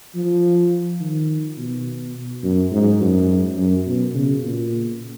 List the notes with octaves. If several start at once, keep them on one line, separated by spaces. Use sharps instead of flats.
F3
D#3
B2
F#2
G#2
F#2
F#2
B2
C#3
A#2